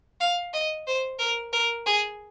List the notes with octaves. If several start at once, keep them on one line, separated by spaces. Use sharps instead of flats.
F5
D#5
C5
A#4
A#4
G#4